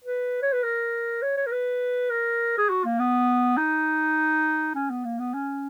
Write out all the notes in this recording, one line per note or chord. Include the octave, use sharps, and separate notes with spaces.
B4
C#5
B4
A#4
C#5
C#5
A#4
B4
A#4
G#4
F#4
A#3
B3
D#4
C#4
B3
A#3
B3
C#4